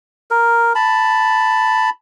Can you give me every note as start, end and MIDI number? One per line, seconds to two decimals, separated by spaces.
0.31 0.73 70
0.75 1.90 81
0.75 1.90 83